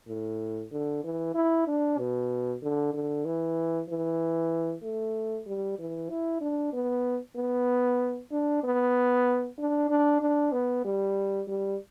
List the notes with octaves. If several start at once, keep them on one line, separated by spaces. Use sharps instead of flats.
A2
D3
E3
E4
D4
B2
D3
D3
E3
E3
A3
G3
E3
E4
D4
B3
B3
D4
B3
D4
D4
D4
B3
G3
G3